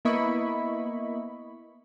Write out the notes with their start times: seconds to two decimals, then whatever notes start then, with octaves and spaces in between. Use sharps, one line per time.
0.05 A#3 B3 E4 D#5 B5 C#6